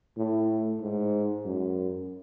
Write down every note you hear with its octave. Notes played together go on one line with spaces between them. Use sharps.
A2
G#2
F#2